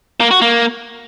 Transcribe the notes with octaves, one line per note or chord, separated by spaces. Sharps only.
A#3
F#4
A#3